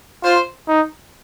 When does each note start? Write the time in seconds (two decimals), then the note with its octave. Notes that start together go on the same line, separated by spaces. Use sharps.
0.23 F4 C5
0.68 D#4